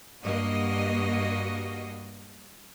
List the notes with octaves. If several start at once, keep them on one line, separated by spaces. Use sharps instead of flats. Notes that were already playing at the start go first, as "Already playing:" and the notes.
G2 A#3 F#4 D#5